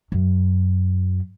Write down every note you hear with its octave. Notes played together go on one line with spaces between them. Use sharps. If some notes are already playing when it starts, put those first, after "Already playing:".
F#2